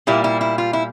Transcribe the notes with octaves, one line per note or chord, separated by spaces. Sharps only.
A#2 G3 A#3 E4
E4
E4
F4
E4